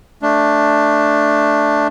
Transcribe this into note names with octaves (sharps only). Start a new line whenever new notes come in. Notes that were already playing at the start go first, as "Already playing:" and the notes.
A3 D4